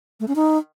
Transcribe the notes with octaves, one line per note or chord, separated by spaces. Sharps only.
A3
C#4
D#4